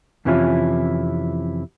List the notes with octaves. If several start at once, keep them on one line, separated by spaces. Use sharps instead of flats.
F2 C3 E3 C#4 E4 F4